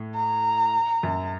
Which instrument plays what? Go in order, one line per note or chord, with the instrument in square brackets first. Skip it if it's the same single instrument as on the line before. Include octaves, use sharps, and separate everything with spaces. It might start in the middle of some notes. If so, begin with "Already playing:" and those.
Already playing: [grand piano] A2
[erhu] A#5
[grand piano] F#2